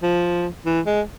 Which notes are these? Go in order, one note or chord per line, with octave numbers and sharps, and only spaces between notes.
F3
E3
G#3